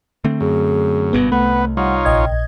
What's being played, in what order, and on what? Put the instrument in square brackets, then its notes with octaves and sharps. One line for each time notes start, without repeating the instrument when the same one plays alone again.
[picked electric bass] D3 A3 C4
[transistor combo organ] F#2 [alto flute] G#4
[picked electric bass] F#1 G2 B2 [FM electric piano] B3
[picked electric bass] C2 [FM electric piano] A3 [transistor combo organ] B3 B4 [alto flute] F#5
[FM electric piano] G3 [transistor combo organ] D#4 F4 C#5 [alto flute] F#5
[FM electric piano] A#1 D#5 G#6 [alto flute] G5